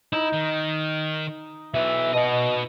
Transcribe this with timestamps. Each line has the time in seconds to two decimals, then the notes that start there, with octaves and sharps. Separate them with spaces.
0.13 D#4 E4
0.33 D#3
1.74 E3 F#3 B3 E5
2.14 B2 F#4 D#5